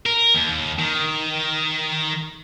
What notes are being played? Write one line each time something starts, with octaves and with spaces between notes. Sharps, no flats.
A#4
D#2
D#3